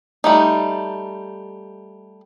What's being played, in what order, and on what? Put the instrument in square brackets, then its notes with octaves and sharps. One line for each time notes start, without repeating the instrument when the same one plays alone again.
[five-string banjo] G3 A3 D#4